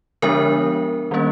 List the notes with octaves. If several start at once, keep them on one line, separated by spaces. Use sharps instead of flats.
D3 F3 G#3 B3 D4 A#4
D#3 G3 A#3 C#4